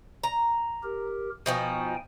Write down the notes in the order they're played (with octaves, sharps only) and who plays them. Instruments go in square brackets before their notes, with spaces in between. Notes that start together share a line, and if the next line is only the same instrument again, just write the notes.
[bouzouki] A#5
[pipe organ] G4 A#4
[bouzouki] B2 F3 D#4 [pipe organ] G5 G#5